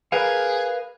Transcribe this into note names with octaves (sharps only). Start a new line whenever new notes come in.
G#4 A#4 B4 F5